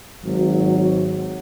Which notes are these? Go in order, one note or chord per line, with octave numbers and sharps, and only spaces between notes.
G#1 F#3